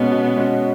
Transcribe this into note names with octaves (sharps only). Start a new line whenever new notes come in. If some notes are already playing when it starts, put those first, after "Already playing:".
Already playing: B2 G#3 B3 C#4 F#4
B2
G#3 C#4 F#4